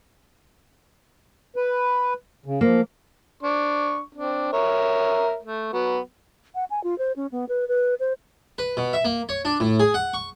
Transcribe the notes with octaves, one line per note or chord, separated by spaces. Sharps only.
B4
C#3
F3 A#3
D4 C#6
C4 D4
A#4 C#5 E5
A3
F#3 B3
F#5
G#5
F4
C5
C#4
B3
B4
B4
C5
B4
B2
E5
A#3
C#5
D4
A2
G#4
F#5
C#6